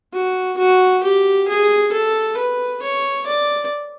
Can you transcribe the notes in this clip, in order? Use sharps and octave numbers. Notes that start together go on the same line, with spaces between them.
F#4
F#4
G4
G#4
A4
B4
C#5
D5